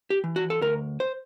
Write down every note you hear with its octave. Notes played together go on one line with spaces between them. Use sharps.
G4
E3
F#4
A4
D2 A#4
C5